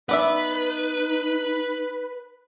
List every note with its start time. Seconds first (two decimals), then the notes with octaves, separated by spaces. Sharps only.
0.09 B3 D#4 B4 D5 E5